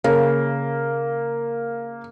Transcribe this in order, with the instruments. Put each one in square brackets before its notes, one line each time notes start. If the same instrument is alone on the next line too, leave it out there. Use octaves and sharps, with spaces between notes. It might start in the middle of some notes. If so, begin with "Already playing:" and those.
[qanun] C#3 [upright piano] A#3